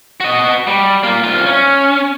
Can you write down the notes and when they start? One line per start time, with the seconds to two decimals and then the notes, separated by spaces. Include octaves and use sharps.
0.20 F#4 D#5
0.67 G3
1.03 A#3 F4
1.24 C2 F4
1.46 C#4